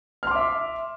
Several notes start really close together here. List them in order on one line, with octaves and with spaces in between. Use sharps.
F6 C6 D6 E5